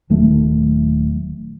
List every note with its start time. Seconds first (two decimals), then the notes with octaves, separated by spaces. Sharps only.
0.10 D#1 D#3 F#3 A3